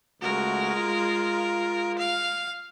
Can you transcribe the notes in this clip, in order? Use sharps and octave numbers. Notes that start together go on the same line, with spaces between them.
C#2 G#3 A3 F#4 A#4
F4
F5